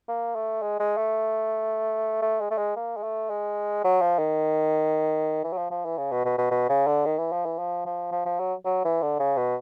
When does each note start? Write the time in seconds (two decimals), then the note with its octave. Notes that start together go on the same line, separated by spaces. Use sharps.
0.08 A#3
0.35 A3
0.62 G#3
0.80 G#3
0.97 A3
2.22 A3
2.41 G#3
2.51 A3
2.58 G#3
2.76 A#3
2.97 G#3
3.03 A3
3.30 G#3
3.84 F#3
4.02 F3
4.19 D#3
5.44 E3
5.53 F#3
5.58 F3
5.71 F3
5.85 E3
5.98 C#3
6.11 B2
6.25 B2
6.38 B2
6.51 B2
6.69 C#3
6.87 D3
7.06 D#3
7.18 E3
7.32 F3
7.46 E3
7.59 F3
7.86 F3
8.12 F3
8.26 F3
8.40 F#3
8.66 F#3
8.84 E3
9.02 D3
9.19 C#3
9.37 B2